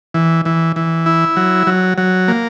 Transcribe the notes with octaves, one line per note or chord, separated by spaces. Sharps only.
E3
E3
E3
E4
F#3
F#3
F#3
A#3